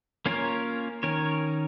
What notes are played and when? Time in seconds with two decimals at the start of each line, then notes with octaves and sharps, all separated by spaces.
0.26 A#3 C#4 F4 A#4 C#5
1.03 D#3 C#4 A#4 C#5